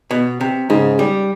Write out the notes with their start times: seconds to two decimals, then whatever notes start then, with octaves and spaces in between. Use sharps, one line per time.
0.11 B2
0.41 C3
0.70 G#2 C#3
0.99 G3